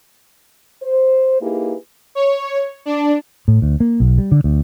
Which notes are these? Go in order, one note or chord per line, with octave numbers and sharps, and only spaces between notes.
C5
A#3 D#4 E4 G4 G#4 B4
C#5
D4
A2
D2
A#3
B1
G3
D3
D2